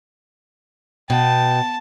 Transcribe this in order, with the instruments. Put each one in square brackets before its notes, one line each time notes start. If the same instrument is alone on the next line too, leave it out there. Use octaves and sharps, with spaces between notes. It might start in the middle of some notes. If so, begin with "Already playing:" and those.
[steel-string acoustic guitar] B2 [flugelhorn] G5 [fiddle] A5